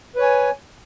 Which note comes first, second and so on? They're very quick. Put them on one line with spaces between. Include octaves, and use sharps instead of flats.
B4 C#5 G#5